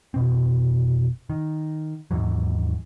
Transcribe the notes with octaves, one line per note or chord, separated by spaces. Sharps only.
F1 B2 C4
D#3
D#2 G#2 E3 F#3